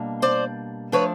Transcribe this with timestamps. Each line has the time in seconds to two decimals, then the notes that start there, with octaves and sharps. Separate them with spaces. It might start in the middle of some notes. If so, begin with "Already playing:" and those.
Already playing: B2 G3 A#3 D4
0.22 C5 D5
0.92 F3 A3 D4 B4 C#5